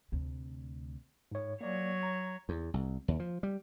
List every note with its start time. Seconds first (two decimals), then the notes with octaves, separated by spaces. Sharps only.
0.12 D2 C3
1.31 G#2 C#5
1.61 F#3 A#3 C#5 D5
2.03 A#5
2.49 E2
2.74 C2
3.08 D#2
3.20 F3
3.43 G3